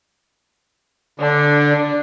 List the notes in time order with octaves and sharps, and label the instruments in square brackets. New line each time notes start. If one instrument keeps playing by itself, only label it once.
[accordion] D3 [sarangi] D4